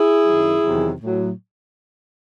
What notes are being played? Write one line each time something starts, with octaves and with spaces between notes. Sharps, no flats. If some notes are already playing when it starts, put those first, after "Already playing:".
Already playing: E4 G#4
F#2 D#3 F#3
E2 C3 D#3 F#3
A2 F#3